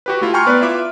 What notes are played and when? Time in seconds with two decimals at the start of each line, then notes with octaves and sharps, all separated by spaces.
0.06 F#4 G4 B4
0.21 A3 E4 F4
0.34 G5 G#5 A#5 C6 C#6 F6
0.46 B3 B4 D5
0.61 E4 F4 B4 E5 D6